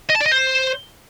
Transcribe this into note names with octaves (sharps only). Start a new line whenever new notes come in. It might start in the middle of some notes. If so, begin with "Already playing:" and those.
D#5
A5
D5
D#5
C5